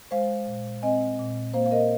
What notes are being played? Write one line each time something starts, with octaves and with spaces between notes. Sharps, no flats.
G#3 C5 F5
A#2
C4 D#5 G#5
A#2
A#3 C5 F5
F5
A#4 D#5